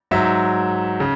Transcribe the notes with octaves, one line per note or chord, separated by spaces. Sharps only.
G#2 F#3 E5
C#3